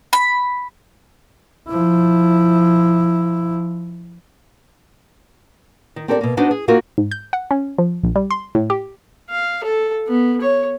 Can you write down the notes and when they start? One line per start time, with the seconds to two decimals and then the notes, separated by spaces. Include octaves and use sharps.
0.13 B5
1.69 F3 E4
5.96 D#3
6.08 C4 G4 A4 A#4 C#5 D5
6.21 B2 A#3
6.37 B3 D4 D#4 F#4 B4 C5
6.51 G#4
6.68 A#3 D#4 F4 F#4 A#4
6.98 G#2
7.11 G6
7.33 F#5
7.51 C#4
7.78 F3
8.03 A#1
8.16 G3
8.31 C6
8.55 A2
8.70 G4
9.29 F5
9.64 A4
10.07 B3
10.41 C#5